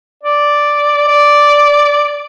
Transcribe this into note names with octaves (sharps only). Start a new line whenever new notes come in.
D5
D5